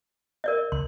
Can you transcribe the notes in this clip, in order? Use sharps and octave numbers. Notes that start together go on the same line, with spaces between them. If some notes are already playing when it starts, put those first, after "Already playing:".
A#4 D5 D#5
C#2 C6